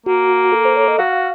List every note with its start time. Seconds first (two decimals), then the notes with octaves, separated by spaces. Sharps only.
0.06 A#3 F#4
0.52 A4
0.65 C5
0.77 C#5
0.88 D#5
0.98 F#4 F5